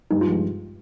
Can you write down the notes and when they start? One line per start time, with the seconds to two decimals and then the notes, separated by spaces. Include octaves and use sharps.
0.11 G2 D#4
0.21 F4
0.27 F3 G#3